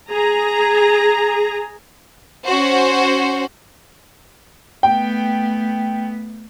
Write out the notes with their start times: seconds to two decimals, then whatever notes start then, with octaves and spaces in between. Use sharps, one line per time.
0.11 G#4 A#5
2.45 C#4 F#4 C5
4.83 A3 B3 G5